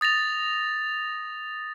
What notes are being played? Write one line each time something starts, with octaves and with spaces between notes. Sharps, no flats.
D#6 A6 A#6 F7